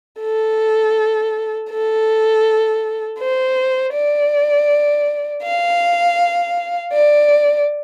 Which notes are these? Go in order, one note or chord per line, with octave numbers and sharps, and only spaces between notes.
A4
A4
C5
D5
F5
D5